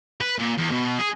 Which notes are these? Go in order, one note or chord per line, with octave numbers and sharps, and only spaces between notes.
B4
A#2
E2
B2
G#4